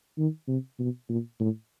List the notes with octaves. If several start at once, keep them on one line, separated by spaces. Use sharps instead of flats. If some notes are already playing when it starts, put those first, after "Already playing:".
D#3
C3
B2
A#2
A2